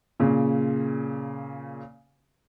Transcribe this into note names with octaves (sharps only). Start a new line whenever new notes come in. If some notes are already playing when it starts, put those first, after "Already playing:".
A#2 C#3